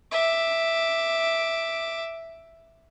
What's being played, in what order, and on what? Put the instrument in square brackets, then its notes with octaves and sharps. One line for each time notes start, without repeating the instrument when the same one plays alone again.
[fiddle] E5 D6